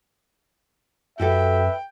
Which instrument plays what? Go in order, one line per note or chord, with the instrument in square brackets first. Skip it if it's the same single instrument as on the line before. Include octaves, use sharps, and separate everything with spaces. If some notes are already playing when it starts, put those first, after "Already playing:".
[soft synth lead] F#2 [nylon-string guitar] F#4 G4 A4 [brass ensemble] B4 E5 [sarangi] G5